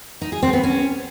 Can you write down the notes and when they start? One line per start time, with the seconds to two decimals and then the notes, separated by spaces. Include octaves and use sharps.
0.22 D#4
0.32 G#4
0.43 C4
0.53 B3
0.64 C#4